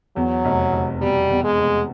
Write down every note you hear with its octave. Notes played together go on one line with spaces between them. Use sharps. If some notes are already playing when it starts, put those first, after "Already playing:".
E2 F#3
F1
F1
B2 G3
E2
G#3
F1